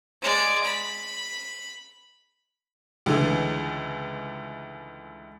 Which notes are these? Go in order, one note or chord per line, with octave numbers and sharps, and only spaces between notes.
G#3 D5
B5
C#2 D3 E3 A3